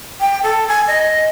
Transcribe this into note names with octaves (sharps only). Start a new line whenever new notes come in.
G5
A4
G#5
D#5